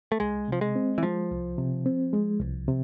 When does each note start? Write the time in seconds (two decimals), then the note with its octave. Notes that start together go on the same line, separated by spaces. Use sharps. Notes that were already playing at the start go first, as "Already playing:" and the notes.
0.12 A3
0.20 C2 G#3
0.48 C3 F3
0.61 G#3
0.76 C4
0.98 E3
1.03 F3 G#3
1.30 C2
1.58 C3
1.86 C4
2.13 G#3
2.40 C2
2.68 C3